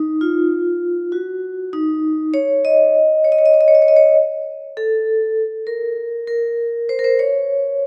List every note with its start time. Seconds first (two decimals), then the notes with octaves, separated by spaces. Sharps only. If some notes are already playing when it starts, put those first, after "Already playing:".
Already playing: D#4
0.21 F4
1.12 F#4
1.73 D#4
2.34 C#5
2.65 D#5
3.24 C#5
3.32 D#5
3.38 C#5
3.46 D#5
3.54 C#5
3.61 D#5
3.68 C#5
3.75 D#5
3.82 C#5
3.88 D#5
3.96 C#5
4.77 A4
5.67 A#4
6.27 A#4
6.89 C5
6.99 A#4
7.04 C5
7.19 C#5